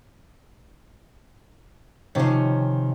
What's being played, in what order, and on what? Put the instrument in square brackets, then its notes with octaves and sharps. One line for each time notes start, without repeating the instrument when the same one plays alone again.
[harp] C3 C#4 [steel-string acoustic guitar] D#3 F3